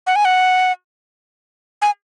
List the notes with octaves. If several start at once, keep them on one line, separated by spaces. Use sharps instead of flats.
F#5
G#5
F#5
G#5